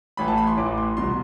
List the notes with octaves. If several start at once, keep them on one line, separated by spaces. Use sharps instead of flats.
A1 A2 E3 B5
A5
B5
C6
A1 A2 E3 D6
C6
C2 B2 C6